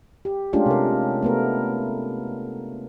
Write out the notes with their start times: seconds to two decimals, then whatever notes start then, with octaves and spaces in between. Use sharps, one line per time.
0.25 G4
0.53 G#3 A3 C#4 D4 F4 G4
0.66 C3 A#4
1.22 A3 B3 A#4